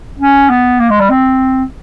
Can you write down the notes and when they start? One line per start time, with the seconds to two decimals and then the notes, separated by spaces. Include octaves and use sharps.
0.19 C#4
0.49 B3
0.80 A#3
0.90 G#3
1.00 G3
1.10 C4